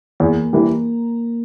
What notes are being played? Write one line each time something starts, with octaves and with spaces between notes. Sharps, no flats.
E2 A#3
E3 G3